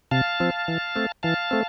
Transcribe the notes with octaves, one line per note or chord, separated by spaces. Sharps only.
C3 F5 A5
F3 C4
E3
A3 C4
E3 F5 A5
A3 C4